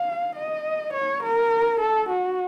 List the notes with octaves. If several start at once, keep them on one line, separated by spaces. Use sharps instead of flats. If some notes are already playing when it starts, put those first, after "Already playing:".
Already playing: F5
D#5
C#5
A#4
A4
F#4